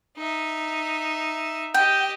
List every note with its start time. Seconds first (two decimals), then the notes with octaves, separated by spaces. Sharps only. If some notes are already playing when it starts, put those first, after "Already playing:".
0.17 D#4 E5
1.74 G4 D#5 G5